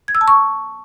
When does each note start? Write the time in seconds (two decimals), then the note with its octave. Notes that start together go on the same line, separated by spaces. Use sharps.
0.08 G#6
0.15 E6
0.21 A5
0.28 C#6